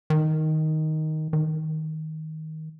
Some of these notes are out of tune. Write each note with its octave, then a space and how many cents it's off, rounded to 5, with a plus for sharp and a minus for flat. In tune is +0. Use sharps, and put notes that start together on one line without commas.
D#3 +5
D#3 +15